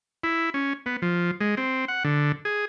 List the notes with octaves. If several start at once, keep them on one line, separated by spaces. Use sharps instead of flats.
E4
C#4
B3
F3
G#3
C4
F#5
D3
G#4